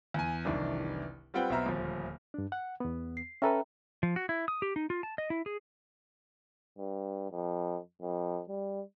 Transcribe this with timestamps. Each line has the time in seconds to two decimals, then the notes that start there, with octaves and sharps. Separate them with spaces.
0.14 E2 G#5
0.45 F1 C2 D#3 E3 D4
1.34 G3 C4 F4 B4 F#5 G5
1.50 B1 B3 C5 E5 A#5 F6
1.66 D#1 D2 F3
2.34 G2 D4
2.52 F#5
2.80 E2 B3
3.17 C7
3.42 C#4 A4 B4 E5 G5 A#5
4.03 F3
4.16 F#4
4.29 E4
4.48 D#6
4.62 G4
4.76 D#4
4.90 F4
5.03 A5
5.18 D#5
5.30 E4
5.46 G#4
6.78 G2
7.31 F2
8.02 F2
8.49 G3